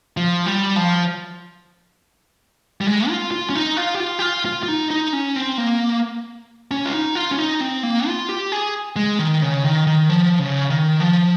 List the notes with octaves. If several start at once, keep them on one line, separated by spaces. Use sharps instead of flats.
F3
G3
F3
G3
G#3
F4
F4
C#4
D#4
F4
G4
F4
G4
F4
F4
F4
D#4
D#4
C#4
C4
A#3
C#4
F4
D#4
F4
C#4
D#4
C4
A#3
F4
G4
G#4
G#3
D#3
C#3
D#3
D#3
F3
C#3
D#3
F3